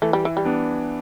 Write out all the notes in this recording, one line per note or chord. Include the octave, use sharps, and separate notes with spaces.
E3 A3
G3
E3
G3
B3 D4